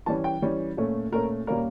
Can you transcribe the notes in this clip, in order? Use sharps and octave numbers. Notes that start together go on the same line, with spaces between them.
E3 G3 C#4 A5
G5
E3 G3 C#4
A#2 A3 C#4
A#2 A3 C#4 A#4
A#2 G3 A#3 C#4 A#4